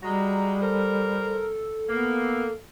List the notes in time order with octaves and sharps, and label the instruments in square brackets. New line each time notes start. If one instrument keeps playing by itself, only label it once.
[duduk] G3 [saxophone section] G#3 F#4 [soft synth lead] A#5
[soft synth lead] A4 [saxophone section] A#4 C5
[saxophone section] A#3 [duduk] B3